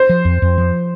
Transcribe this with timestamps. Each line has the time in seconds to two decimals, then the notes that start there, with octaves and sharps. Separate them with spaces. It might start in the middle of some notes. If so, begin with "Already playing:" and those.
Already playing: C5
0.09 F3
0.25 F2
0.42 F2
0.58 F3